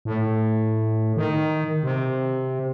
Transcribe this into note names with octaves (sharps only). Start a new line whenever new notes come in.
A2
D#3
C3